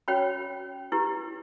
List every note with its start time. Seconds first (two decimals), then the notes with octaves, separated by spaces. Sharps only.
0.08 C#4 F#4 C#5 G5 B5
0.92 E4 G4 B4